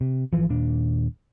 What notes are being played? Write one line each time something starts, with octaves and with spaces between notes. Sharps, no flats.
C3
G#1 E3 F3
D#1 A#2 D4